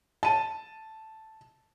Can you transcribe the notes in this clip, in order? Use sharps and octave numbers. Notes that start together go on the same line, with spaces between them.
A5 D#7